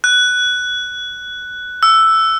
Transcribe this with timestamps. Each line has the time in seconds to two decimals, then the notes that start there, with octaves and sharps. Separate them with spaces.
0.04 F#6
1.83 E6